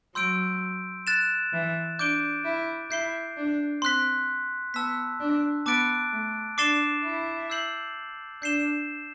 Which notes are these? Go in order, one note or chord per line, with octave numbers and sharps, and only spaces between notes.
F#3 C6 E6 G6 D7
F#6 A6 E7
E3
D4 D6 G6 D7 G7
E4
E4 G6 C7 G7
D4
C4 C6 F#6 B6
B3 A5 E6 B6
D4
B3 A5 D6 F#6 A6 D7
A3
D4 D6 A6 C7 E7 G7
E4
E6 G6 C7 F#7
D4 G6 C7 E7 G7